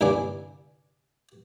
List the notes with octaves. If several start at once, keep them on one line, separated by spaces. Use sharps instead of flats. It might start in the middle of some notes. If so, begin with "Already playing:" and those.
C2 G2 D3 D4 G#5 D6